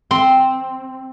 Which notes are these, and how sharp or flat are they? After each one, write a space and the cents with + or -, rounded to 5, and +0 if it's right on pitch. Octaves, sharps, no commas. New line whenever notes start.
C4 +0 C6 +0